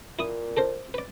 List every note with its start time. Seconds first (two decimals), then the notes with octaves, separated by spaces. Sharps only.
0.19 A#2 E4 D#6
0.57 A4 A#4 C5
0.94 B4 D5